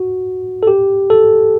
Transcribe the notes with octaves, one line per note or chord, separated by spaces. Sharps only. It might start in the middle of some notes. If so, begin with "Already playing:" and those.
Already playing: F#4
A4
G4
A4